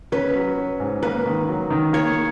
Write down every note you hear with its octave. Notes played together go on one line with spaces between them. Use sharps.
C#4 B4
F#3
C#4
G#2
A#3 B4
D#3
F#3
D#3
A#3 C#5